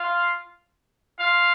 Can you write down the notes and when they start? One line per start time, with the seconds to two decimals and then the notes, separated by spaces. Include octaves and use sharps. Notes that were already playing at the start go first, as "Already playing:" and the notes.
Already playing: F4 F5
1.18 F4 F5